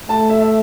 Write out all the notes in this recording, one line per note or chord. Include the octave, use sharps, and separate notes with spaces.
A3 A5
E5
E5